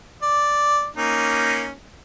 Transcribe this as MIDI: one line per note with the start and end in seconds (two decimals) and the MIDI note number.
0.22 0.87 74
0.96 1.72 58
0.96 1.72 61
0.96 1.72 63